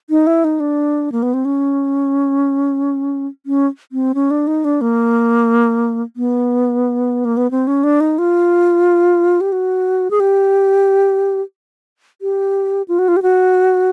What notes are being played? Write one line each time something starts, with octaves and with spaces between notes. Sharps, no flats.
D#4
E4
D#4
D4
A#3
B3
C4
C#4
C#4
C4
C#4
D4
D#4
D4
A#3
B3
A#3
B3
C4
C#4
D4
D#4
F4
G4
F#4
G#4
G4
G4
F4
F#4
F4
G4
F#4